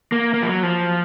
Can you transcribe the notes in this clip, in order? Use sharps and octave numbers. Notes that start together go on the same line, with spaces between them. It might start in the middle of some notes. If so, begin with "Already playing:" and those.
A#3
A#3
F3
F#3
F3